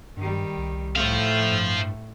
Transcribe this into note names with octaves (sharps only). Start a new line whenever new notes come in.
G2 D#3 G3
C2
A2 A3 C5 F5
G2